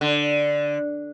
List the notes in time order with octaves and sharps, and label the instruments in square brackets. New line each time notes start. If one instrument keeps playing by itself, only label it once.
[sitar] D3